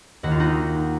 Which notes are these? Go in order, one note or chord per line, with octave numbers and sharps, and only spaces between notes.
D#2 D#3 F#4
F4
D#4 F#4